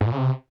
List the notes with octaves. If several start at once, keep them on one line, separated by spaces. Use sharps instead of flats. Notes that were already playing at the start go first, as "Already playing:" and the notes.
G#2
A#2
C#3
C3